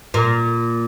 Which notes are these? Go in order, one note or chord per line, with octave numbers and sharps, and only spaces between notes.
A#2